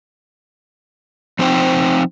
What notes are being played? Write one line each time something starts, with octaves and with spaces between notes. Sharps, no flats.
F3 C4 D4 D#4 C5 G5